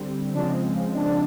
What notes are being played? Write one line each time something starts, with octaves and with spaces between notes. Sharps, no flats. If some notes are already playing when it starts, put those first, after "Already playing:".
Already playing: D3 G3 C4
C#3 F3 G#3 C4 D4
D4